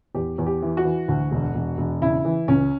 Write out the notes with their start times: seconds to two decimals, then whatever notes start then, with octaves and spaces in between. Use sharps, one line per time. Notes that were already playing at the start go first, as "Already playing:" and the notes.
0.15 E2 G4
0.38 E2
0.46 G4
0.62 E3
0.77 F#4
0.85 E3
1.08 D2
1.32 E1
1.55 E1
1.78 E1
2.02 C#3 E4
2.25 E3
2.48 C#2 C#4